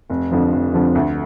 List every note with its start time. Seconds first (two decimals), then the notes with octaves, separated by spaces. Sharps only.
0.10 F1
0.31 F2 D3 F3
0.52 F1
0.73 F2 D3 F3
0.95 D2